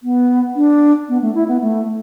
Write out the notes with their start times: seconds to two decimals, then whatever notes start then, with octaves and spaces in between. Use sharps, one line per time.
0.03 B3
0.56 D4
1.09 B3
1.22 A3
1.35 E4
1.48 B3
1.61 A3